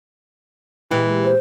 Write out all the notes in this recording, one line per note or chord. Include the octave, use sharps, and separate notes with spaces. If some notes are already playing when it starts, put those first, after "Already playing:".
A#2 E3 G#3 G4
C5